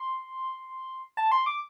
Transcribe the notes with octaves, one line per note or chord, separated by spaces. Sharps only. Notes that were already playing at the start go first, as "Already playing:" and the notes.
Already playing: C6
A5
C6
D6